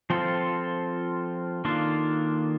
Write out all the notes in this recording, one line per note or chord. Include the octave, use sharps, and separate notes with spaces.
F3 C4 F4 A4
D#3 A#3 D4 F4 A4